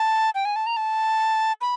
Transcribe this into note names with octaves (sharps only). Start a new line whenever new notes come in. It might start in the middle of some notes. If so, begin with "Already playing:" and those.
Already playing: A5
G5
G#5
A5
A#5
A5
B5